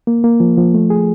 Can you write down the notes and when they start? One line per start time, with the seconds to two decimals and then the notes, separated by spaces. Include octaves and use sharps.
0.07 A#3
0.24 A#3
0.40 F3
0.57 F3
0.74 A3
0.90 G#4